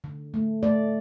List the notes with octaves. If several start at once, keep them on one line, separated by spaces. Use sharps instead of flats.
D3
A3
A3 D5